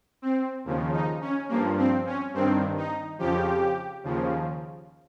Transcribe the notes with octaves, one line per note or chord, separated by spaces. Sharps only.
C4
D#2 C#3 F3
D#4
C#4
G2 F3 A#3
C4
C#4
G2 D#3 C4
D#4
F2 C#3 F3 G4
D#2 C#3 F3